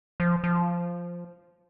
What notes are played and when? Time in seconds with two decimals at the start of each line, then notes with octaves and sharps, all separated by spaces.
0.20 F3
0.44 F3